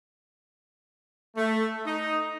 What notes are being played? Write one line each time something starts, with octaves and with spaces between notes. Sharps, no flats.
A3
D#4